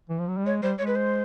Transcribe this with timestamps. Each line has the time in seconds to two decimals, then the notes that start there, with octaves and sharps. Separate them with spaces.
0.09 E3
0.19 F3
0.28 F#3
0.37 G3
0.46 G#3 C#5
0.62 G3 C5
0.78 G#3 C#5
0.87 B4
0.96 C5